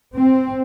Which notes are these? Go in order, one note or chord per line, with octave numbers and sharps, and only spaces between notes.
C4